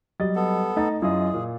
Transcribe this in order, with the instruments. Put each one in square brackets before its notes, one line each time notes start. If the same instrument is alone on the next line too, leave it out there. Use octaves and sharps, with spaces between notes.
[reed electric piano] F#3 D#5 [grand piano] G3 A6
[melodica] B3 A4
[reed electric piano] A3 D#4 [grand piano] D#5 A#5 A6
[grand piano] F#2 F4 D#5 [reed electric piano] E4 [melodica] G#4
[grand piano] A#2